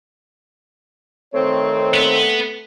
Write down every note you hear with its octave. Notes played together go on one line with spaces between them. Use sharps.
D#3 A3 C4 C#5
B3